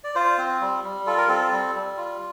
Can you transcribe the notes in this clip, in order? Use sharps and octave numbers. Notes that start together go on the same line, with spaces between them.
D5
F4 C5
C4
G3
G3
F4 A4
A#4
C4 A4
G3
G3
F4